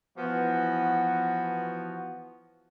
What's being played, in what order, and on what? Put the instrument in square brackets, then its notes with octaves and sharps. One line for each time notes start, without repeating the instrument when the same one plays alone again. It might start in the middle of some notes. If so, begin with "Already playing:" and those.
[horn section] E3 F3 B3 F#4